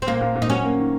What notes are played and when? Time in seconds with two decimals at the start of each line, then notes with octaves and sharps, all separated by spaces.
0.02 C4
0.07 A#2 A#3
0.21 A#2
0.35 A#2
0.42 D#4
0.50 F#3 C#4
0.64 A#3
0.77 D#3